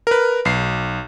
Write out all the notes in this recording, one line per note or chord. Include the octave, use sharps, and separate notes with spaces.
A#4 B4
B1 C7